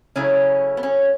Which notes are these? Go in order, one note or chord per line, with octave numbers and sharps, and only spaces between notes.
C#3 F#3 A3 C#4 E4
B3
C#4